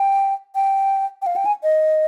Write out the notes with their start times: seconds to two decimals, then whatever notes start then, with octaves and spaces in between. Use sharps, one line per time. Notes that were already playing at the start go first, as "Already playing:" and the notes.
Already playing: G5
0.55 G5
1.22 G5
1.26 F5
1.36 G5
1.46 G#5
1.63 D#5